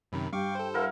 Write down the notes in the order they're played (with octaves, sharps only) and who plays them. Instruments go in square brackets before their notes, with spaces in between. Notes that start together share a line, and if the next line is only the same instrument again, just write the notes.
[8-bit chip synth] F#2 C3 D#3 [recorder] B5
[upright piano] G2 [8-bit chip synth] F5 C#6 D6 [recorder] G5
[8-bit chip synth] A4 C5
[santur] E4 A#4 F5 [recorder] F#5